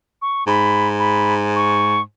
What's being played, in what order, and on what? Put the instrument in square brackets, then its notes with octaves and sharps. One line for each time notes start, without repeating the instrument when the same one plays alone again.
[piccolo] C#6
[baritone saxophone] G#2 [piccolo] B5
[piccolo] B5
C#6